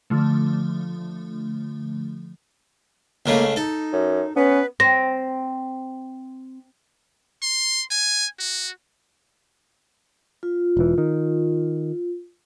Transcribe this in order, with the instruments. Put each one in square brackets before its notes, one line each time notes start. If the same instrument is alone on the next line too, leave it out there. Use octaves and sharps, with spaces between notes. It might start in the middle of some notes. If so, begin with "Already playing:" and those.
[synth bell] D3 F3 A3
[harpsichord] C#2 C#3 A3 [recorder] A#3
[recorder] D#4 [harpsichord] A4
[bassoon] F#2
[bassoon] B3 [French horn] C#4 [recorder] B4
[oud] C4 [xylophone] A#6
[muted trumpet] C6
G#5
F#4
[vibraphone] F4
[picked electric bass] E1 E3
D#3